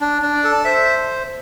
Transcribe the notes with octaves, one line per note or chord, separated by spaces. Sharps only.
D4
D4
D5
A4
C5 E5